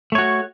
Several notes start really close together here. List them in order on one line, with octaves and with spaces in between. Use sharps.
A3 C#5 F#4